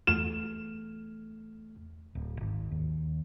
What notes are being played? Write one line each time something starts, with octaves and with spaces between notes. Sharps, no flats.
E2 A3 F6 E7
D1
G#1
D#2